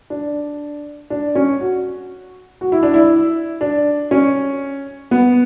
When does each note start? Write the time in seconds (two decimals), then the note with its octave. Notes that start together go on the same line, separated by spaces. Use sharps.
0.10 D4
1.10 D4
1.35 C#4
1.61 F#4
2.61 F#4
2.72 E4
2.83 D4
2.94 E4
3.61 D4
4.11 C#4
5.11 B3